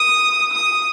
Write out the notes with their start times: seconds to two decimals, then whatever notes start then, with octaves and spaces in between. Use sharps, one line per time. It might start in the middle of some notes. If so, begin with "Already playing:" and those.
Already playing: D#6
0.53 D#6